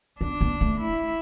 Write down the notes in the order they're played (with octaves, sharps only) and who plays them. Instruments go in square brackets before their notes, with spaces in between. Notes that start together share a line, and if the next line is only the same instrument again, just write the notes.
[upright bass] B3 [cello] D4
[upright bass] B3
A3
[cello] E4